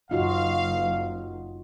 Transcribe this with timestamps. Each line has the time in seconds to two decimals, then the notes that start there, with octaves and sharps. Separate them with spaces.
0.11 F#1 D#4 F4 F#4 F5